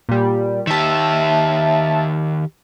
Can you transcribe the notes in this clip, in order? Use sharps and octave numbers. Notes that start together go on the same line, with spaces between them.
A#2 G3
D#3 G4 E5 A5